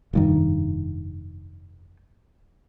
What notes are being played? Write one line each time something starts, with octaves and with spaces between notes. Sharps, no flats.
F1 G2 D#3